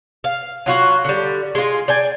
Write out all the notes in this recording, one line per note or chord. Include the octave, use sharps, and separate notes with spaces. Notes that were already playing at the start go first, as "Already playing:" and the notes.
F5
F#3 F4 F#4
D3 G3
G#3 F4
D5 G5 G#5